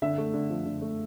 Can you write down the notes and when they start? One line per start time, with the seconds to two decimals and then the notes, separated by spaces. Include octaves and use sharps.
0.02 D3 E5
0.18 A3
0.34 D3
0.50 F3
0.66 D3
0.82 A3